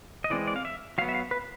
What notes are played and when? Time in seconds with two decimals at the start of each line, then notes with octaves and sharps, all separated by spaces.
0.24 D#5
0.30 E3 G#3 C4 D5
0.47 D5
0.56 F5
0.65 E5
0.98 F#3 F5
1.02 B3
1.09 E5
1.15 F5
1.31 B4